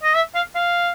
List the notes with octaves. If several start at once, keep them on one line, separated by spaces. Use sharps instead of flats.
D#5
E5
F5
F5